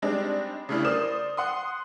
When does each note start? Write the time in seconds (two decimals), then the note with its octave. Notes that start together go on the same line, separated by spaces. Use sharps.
0.02 G3 G#3 C4 D4 D#4
0.69 C#3 G3 A3 D4 E4
0.85 A#4 C5 D5 D#6 E7
1.37 F#5 C6 D#6